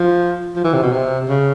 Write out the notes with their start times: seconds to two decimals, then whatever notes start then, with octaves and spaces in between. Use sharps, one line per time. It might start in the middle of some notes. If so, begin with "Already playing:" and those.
Already playing: F3
0.56 F3
0.64 E3
0.74 C3
0.83 B2
0.92 C3
1.29 C#3